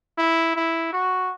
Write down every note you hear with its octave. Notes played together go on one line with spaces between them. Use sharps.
E4
E4
F#4